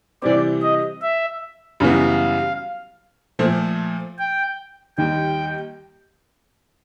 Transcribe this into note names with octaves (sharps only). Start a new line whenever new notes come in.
C3 E3 G3 C4 D5
D#5
E5
F#2 C#3 E3 G3 B3 F5
A#2 F3 A3
G5
D#2 D#3 G3 G5